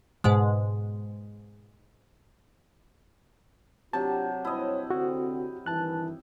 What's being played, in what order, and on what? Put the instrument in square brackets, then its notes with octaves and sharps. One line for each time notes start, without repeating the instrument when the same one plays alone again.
[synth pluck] G#2 B2 G#3
[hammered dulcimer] C3 F#3 [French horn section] D4 F4 G4 [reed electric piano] A5
[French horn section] G2 C5 C#5 [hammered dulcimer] E4 D#5
[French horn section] D3 C4 [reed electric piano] F#4
[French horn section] G2 D#3 E3 [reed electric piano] A5 F#6